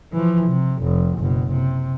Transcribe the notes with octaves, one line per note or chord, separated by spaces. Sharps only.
E3 F3
C3
F1
F#1 B2
C3